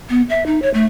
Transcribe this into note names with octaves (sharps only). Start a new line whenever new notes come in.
B3
E5
D#4
C#5
A3